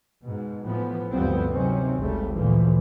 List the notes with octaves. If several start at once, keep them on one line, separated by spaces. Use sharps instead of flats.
G#2 B2
A2 E3 F3 B3
D2 G2 F3 G3 B3 C4
C3 D#3 F#3 C4 C#4
G#1 D2 C#3 G3 A3
D2 A#2 D3 E3 F3